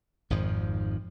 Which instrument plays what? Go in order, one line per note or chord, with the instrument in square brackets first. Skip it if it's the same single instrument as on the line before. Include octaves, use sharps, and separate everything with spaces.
[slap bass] G#1 F2 G#2 F3